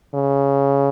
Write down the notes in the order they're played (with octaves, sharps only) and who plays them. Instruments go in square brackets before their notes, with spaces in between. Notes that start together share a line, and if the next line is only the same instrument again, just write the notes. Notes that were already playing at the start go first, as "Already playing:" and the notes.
[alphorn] C#3